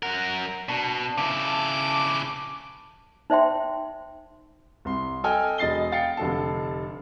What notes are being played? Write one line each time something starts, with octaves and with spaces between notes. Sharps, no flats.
F#2 A#4 F#5
B2 D4 A5
C#3 E4 D6
D#4 C5 E5 G5 C6
C2 C6
A4 D#5 G5 G#5 F6
E1 D#5 A6 C7 G7
F5 G5 A6 C7 C#7
F1 D3 A4 A5